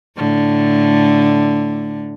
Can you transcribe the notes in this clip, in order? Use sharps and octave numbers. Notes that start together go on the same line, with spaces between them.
A2 D3